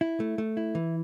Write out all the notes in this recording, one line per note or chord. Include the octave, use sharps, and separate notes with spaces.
E4
A3
A3
E4
E3